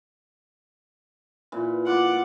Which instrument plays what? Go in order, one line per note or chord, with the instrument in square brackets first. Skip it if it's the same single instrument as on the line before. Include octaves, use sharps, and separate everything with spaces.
[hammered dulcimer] A#2 E3
[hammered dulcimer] F4 [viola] F#5 D6